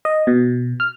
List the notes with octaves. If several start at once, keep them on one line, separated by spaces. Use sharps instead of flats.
D#5
B2
F6